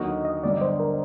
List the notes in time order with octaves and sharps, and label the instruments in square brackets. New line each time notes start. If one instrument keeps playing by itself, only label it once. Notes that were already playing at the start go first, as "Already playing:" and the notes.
Already playing: [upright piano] D#2 D3 F#3 A#3 F#4 [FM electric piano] D#5
[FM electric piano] D#5
[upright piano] G1 G2 F#3 [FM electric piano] D5
[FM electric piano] C5
A#4